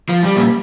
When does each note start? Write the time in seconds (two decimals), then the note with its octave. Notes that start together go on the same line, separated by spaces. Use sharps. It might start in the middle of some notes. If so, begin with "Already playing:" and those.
0.09 F3
0.25 G3
0.36 A#2